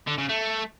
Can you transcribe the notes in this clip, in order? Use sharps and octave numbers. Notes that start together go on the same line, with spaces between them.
D3
C#3
A3